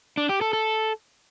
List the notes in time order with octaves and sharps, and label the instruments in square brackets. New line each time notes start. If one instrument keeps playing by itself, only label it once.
[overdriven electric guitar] D4
G4
A4
A4